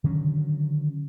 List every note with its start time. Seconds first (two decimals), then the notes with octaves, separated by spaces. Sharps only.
0.04 D3 D#3 F#3 C#4